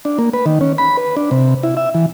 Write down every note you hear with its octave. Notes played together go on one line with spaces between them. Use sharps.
D4
A#3
B4
D#3
C#4
B5
B4
D4
C3
E4
E5
E3